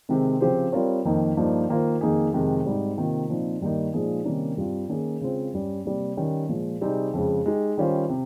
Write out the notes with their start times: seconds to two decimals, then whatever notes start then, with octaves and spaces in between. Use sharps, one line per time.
0.09 C3 D#3 G#3 C4
0.41 C#3 F3 C4 G4 C5
0.72 G3 C4 F4 A#4 C#5
1.05 F2 D#3 A#3 D#4
1.37 G2 F3 A#3 D#4
1.69 D#3 A#3 F4 C5
2.01 F2 D#3 A#3 D#4 G#4
2.33 F2 C3 D#3 G#3
2.65 G#2 G3 C4 D#4
2.97 C3 D#3 A#3 F4
3.29 A#2 F3 C4 D#4
3.61 G2 D#3 G3 A#3 D#4
3.93 A#2 F3 G#3 D#4 G#4
4.25 C3 D#3 G3 A#3 C#4
4.57 G2 G3 C4 F4
4.89 D#3 A#3 C#4 G#4
5.21 C#3 G#3 C4 F4 C5
5.53 G2 G3 C#4
5.85 C3 G3 A#3
6.17 D#3 G3 C#4
6.49 A#2 F3 G#3
6.81 C3 G3 C4 D#4 G#4
7.13 F2 C#3 G#3
7.46 G#3 D#4 G4
7.77 D#3 G3 C#4 F4 C5
8.09 C3